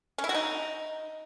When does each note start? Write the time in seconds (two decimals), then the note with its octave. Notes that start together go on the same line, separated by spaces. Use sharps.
0.18 C#4
0.24 E4
0.29 F#4
0.34 D#4